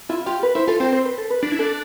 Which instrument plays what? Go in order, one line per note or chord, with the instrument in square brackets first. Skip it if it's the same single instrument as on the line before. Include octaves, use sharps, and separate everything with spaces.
[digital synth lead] E4 [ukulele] F4
[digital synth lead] F4 [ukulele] G4
[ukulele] B4
[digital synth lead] E4 [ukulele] C5
[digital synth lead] F4 [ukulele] A4
[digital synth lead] C4 [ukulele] C5
[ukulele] C5
B4
A4
B4
[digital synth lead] D4
E4
[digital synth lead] D4 [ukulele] A4